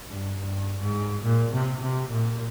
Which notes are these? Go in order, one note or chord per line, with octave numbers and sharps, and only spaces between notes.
G2
G2
G#2
A#2
C3
C3
A#2